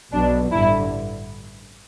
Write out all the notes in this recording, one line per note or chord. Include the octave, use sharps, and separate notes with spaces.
B1 B2 F#3 D4
A1 G2 D3 E4